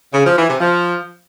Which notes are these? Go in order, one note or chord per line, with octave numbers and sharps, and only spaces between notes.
C#3
F3
E3
C3
F3